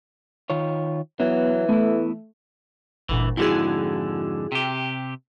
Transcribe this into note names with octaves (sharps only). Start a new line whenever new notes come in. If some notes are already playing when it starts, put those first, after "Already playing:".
D#3 F4 C#5
E3 F#3 B3
A3 B3 E4
G1 D2 A#2 E3
F2 G#2 D3 E4 F#4 G#4
C3 G4